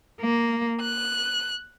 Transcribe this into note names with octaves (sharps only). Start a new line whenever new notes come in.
A#3
F#6